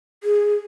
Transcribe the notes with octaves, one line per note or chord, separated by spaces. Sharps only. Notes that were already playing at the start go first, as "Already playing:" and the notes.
G#4